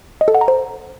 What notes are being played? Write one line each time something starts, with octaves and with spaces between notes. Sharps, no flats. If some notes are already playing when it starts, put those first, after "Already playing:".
D#5
A4
F#5
A#5
C5